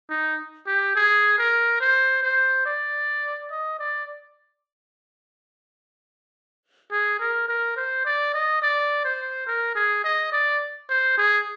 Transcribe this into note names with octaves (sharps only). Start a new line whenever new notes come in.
D#4
G4
G#4
A#4
C5
C5
D5
D#5
D5
G#4
A#4
A#4
C5
D5
D#5
D5
C5
A#4
G#4
D#5
D5
C5
G#4